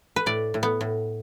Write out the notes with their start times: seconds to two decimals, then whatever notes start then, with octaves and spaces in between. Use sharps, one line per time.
0.16 B4
0.26 A2 D5
0.54 A2
0.63 B3
0.81 A2